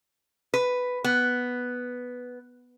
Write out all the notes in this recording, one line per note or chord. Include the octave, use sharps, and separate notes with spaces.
B4
B3